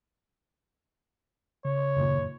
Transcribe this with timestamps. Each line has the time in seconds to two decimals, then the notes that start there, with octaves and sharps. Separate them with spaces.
1.65 C#3 C#5
1.96 F#1 D#2 A#2